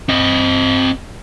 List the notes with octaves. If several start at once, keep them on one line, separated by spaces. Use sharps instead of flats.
C4 D#5